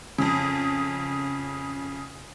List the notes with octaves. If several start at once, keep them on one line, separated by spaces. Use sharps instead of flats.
F2 C#3